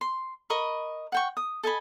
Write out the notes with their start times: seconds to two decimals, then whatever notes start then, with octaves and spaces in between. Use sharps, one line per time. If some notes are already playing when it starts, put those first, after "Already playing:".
0.01 C6
0.50 A#4 D#5 B5 C#6
1.12 F#5 G5 C#6
1.37 D#6
1.63 A4 D#5 G#5 B5